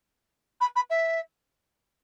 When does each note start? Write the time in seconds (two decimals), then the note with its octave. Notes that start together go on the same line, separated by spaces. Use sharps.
0.60 B5
0.75 B5
0.90 E5